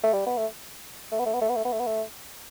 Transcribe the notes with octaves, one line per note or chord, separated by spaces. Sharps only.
A3
G3
B3
A3
A3
B3
A3
B3
A3
B3
A3
B3
A3
B3
A3